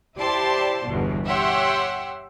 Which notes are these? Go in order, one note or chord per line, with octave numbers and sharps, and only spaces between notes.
E4 G4 C5 D5 A5 C6
G1 E2 B2
G4 C#5 E5 F#5 G5 C6